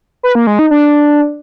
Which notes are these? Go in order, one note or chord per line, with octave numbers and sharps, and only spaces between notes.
B4
A#3
G#3
D#4
D4